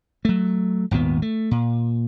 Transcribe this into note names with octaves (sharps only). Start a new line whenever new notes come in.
F#3 A3
G#1 D#2 A#2 B3
A3
A#2